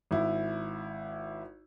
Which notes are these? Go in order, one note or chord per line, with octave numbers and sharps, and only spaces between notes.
G#1 E4